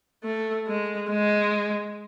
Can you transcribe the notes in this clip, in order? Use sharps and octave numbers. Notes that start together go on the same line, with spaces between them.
A3
G#3
G#3